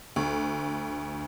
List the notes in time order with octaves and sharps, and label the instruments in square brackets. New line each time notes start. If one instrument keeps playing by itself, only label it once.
[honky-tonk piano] D2